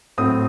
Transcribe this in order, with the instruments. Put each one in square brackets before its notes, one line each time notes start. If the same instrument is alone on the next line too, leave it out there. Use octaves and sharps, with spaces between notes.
[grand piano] A2 F#3 C4 D#6